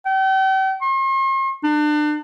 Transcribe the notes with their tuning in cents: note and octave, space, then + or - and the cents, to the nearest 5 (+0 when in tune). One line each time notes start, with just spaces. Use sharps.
G5 -40
C6 +45
D4 +35